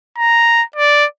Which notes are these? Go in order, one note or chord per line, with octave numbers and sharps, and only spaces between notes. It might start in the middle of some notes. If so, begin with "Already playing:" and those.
A#5
D5